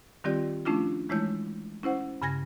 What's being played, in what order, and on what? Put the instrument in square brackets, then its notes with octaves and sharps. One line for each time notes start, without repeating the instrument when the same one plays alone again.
[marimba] D#3 G3 C4 F4 G4 D5
F3 A3 C#4 D4 E4 F4
E3 G#3 A3 E4 C#5 G6
C#4 E4 C5 F#5
G2 C#3 G#5 G#6 A#6